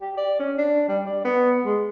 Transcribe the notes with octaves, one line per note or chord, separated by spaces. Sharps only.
G4
D5
C#4
D4
G3
D5
B3
G#3